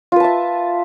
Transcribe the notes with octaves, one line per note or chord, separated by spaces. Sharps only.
F4 B4 E5 A5